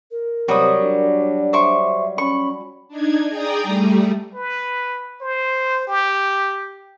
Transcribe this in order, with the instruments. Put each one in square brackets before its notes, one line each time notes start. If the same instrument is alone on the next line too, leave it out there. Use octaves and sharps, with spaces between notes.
[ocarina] A#4
[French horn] C3 [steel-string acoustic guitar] F#3 G3 [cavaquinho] F#4 D#6
[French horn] D4
[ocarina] C#5
[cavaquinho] C5 C#6 D6 [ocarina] E5
[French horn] C#4 [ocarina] B5 [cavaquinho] C#6
[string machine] D4 D#4 G#6
G#4 D5 G5 A#5 D#6
G3 A3
[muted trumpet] B4
C5
G4